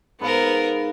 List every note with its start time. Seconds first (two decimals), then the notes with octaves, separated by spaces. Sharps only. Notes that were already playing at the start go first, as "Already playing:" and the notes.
0.20 G#2 B3 A#4 B4 F5